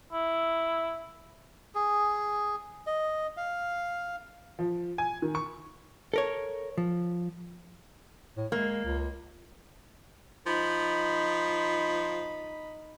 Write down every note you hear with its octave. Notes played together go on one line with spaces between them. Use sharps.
E4
G#4
D#5
F5
F3
G#5
D#3
C#6
A4 A#4 C#5
F3
A2
G#3 A#3
C#2
F3 D#4 B5